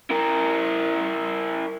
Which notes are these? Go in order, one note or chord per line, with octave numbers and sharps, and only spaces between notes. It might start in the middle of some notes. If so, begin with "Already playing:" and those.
E4 A#4